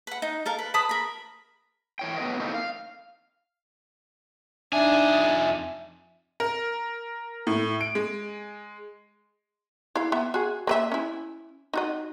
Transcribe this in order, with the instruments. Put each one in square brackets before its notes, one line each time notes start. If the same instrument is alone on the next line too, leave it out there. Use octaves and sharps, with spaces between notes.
[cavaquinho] B4 F#5
D#4
A4 A#4 F5
B4
B4 A5 B5 D#6
A#4 B5
[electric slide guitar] E3 C#5 G5
A2 B3 F4 B4 C#5 D#5
A2 A#3 C4 D#4
F5
[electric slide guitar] F2 G#4 G#5 [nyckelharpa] D4 D#4 [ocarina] E5
[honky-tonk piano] A#4
A2
D7
G#3
[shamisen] E4 F5
B3 E5
F#4 G#4
A#3 B4 E5
C#4 E4
D#4 F#4 D#5